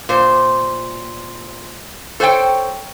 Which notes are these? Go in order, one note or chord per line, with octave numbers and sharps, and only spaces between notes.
A#2 C5
A4 C5 C#5 F#5 G5